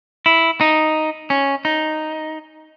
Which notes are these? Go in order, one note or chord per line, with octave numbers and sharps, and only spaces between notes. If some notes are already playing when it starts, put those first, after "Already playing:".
E4
D#4
C#4
D#4